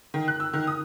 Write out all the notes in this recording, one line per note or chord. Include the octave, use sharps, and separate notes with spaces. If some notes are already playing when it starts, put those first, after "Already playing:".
D#3
F#6
E6
D#3
D#6